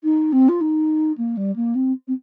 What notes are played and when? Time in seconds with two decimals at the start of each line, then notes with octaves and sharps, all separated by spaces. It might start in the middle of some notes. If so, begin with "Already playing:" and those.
0.03 D#4
0.32 C4
0.48 F4
0.61 D#4
1.17 A#3
1.37 G3
1.55 A#3
1.75 C4
2.07 C4